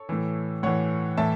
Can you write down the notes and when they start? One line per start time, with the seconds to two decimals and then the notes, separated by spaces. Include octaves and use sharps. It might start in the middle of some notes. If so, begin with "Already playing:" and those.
Already playing: A4 C#5
0.09 A2 E3
0.63 A2 E3 C#5 F#5
1.17 A2 E3 E5 A5